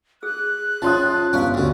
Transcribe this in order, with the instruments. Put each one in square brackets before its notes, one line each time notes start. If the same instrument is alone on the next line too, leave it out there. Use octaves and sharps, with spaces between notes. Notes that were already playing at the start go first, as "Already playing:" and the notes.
[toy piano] G#4 D#6 E6 [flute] F#6
[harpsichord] F3 [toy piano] C#4 C#5 E5 [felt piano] A5 C6 D#6
[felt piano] G1 G3 [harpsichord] C#4 [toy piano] G4 F5 G#5
[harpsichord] D2 C#3 [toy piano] F#4